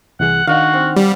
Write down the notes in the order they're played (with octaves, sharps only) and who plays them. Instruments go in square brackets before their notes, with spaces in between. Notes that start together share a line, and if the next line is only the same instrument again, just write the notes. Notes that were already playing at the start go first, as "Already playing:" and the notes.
[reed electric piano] C2 E3 G#4 [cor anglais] F#5
[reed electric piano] D#3 D4 D#4 [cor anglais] F#4 [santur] F5 F#5
[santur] C4
[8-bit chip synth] G3